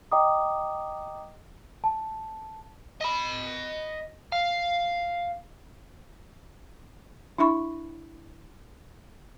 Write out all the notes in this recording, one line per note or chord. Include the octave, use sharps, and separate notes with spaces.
D#5 G5 A#5 D6 D#6
A5
D#5 B5
F5
D4 E4 E5 B5 C#6